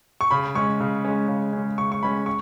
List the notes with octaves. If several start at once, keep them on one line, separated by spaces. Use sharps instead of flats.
C#6
C#3 B5
G#3 C#4 C#6
C#3
G#3 C#4
C#3
G#3 C#4
C#3 C#6
C#6
G#3 C#4 B5
C#6